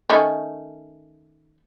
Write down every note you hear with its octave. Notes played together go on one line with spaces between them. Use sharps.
D#3 A3 C#4